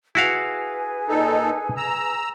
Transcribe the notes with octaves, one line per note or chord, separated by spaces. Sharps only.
E4 F#4 G#4 B4 F5 G#5
A#2 D#4 A4
A#5 E6